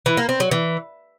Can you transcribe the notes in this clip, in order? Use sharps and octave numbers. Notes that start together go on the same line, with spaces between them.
E3
A#3
C4
F#3
E3